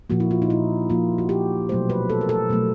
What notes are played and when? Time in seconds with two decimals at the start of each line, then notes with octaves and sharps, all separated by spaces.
0.10 A#2 F3 A#3 F#4
0.20 E4
0.31 F4
0.42 D#4
0.50 E4
0.90 A#2 F3 A#3 F4
1.18 F#4
1.29 G4
1.69 B2 F#3 A3 C5
1.89 B4
2.10 A4
2.21 A#4
2.29 A4
2.49 B2 F#3 A3